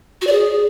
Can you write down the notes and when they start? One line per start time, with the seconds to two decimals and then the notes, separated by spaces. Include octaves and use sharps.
0.21 F#4
0.27 D5
0.32 G#4